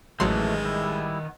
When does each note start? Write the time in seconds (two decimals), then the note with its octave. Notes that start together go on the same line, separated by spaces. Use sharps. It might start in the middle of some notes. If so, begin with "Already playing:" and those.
0.20 A1 D#3 E3 F#3 G#3 A3 B3 C6
0.65 G3 E4